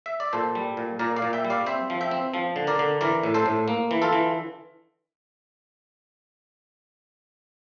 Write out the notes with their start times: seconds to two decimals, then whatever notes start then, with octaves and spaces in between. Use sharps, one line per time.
0.06 E5
0.20 D5
0.33 A#2 A4 C5
0.55 G3
0.77 A#2
0.99 A#2 A#4 D5
1.16 D5 F5
1.22 A#2
1.33 E5 G5
1.44 G3
1.50 D5 F5
1.66 C4 C5 E5
1.90 F3
2.01 E5 G5
2.11 C4
2.34 F3
2.56 D3
2.67 A#4 D5
2.79 D3
3.01 E3 A#4 D5
3.23 A2
3.34 A4 C5
3.46 A2
3.68 A#3
3.91 E3
4.02 F4 A4
4.13 E3